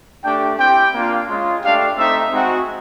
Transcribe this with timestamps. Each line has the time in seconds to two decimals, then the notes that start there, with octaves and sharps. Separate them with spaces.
0.24 A3 D4 G4 G5
0.59 C4 E4 G4 G5
0.93 A#3 D4 F4
1.28 G#3 C#4 F4
1.63 A3 D4 G4 F5
1.97 A3 C4 D#4 E5
2.32 G#3 C4 D#4 F#4